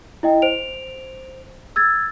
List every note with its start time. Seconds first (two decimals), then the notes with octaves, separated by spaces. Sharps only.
0.23 E4 D#5 G5
0.42 C5 D7 F7
1.76 E6 G#6 A6